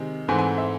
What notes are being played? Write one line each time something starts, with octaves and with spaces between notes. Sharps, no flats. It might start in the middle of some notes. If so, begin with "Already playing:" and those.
Already playing: C3 D#3 G#3
G#2 E3 A3 C4 G#5
G#5
E5